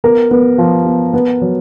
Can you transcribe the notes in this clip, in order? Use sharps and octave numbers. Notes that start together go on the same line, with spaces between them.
B3 A#4
B3
F3
B3
B3
F#3